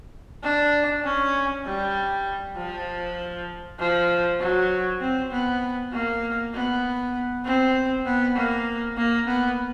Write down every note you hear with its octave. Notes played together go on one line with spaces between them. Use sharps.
D4
C#4
G3
F3
F3
F#3
C4
B3
A#3
B3
C4
B3
A#3
A#3
B3